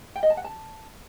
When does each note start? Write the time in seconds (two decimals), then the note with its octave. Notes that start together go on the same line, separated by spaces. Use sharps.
0.16 G5
0.23 D#5
0.30 A5
0.37 F#5
0.44 A5